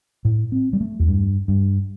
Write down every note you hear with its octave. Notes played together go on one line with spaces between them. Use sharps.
A2
C4
G3
A3
E2
G2
G2